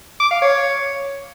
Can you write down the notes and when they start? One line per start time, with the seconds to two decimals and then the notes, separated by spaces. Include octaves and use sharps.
0.20 D6
0.31 F5
0.42 C#5